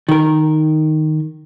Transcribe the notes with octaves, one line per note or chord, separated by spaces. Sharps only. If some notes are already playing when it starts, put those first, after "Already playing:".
D#3 A#4